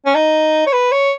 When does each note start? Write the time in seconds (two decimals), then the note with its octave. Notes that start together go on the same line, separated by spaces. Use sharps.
0.06 C#4
0.15 D#4
0.67 C#5
0.73 B4
0.92 C#5